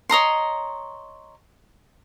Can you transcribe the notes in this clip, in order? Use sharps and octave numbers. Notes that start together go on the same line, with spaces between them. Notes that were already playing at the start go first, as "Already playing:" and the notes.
C#5 D#5 A#5 C6